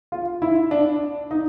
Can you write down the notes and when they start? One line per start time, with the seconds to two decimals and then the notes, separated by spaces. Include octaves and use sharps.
0.12 F4
0.42 E4
0.71 D4
1.31 D#4